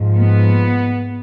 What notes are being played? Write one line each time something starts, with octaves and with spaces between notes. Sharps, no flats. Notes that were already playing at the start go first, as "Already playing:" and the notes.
Already playing: G#2 F3
B3